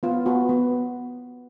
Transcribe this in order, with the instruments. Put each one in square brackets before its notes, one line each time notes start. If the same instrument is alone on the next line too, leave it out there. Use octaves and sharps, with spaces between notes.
[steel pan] B3 F4
B3 F#4
B3